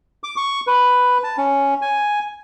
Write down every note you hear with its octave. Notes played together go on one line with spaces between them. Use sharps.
D6
C#6
B4
A5
C#4
G#5